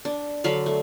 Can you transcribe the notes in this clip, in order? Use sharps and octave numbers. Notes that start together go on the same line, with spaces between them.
D4
D3 F#3 F5 B5
A3